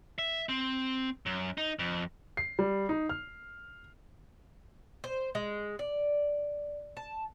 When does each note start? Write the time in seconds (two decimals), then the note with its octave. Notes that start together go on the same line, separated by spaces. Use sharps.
0.19 E5
0.49 C4
1.26 F#2
1.57 D#4
1.79 F2
2.37 C7
2.59 G3
2.89 D#4
3.09 F6
5.04 C5
5.35 G#3
5.79 D5
6.97 A5